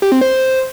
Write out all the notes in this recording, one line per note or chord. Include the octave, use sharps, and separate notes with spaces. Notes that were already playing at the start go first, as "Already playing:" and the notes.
G4
C4
C5